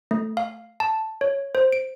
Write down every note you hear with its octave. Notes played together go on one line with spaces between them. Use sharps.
A3
F5
A5
C#5
C5
D7